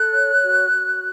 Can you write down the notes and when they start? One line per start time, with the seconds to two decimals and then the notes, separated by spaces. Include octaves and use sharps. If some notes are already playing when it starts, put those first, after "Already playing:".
Already playing: A4 F#6
0.11 C#5
0.42 F#4
0.72 F#4